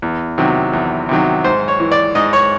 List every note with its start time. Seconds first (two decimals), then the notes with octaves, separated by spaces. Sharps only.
0.02 E2
0.38 C3 D#3 F#3
0.73 E2
1.09 C3 D#3 F#3
1.44 G#2 C5
1.68 C#5
1.80 E3
1.92 D5
2.15 G#2 D#5
2.33 C#5